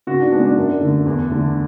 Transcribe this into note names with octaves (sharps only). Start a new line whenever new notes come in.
C#3 F#4
D4
G#3 B3 D4
D4
F#2
D3 A3
E2
D3 A3